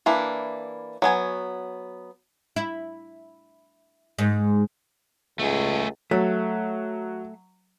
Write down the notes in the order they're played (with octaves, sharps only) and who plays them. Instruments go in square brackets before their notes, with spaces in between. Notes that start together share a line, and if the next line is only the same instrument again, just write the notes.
[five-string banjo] E3 A#3 D4 E4
F#3 B3 G#5
[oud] E4
G#2
[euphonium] C#2 [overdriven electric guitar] A3 G#4
[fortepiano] F#3 [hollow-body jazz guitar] A3